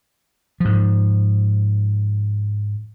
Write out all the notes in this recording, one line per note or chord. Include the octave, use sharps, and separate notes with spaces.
G#2 F3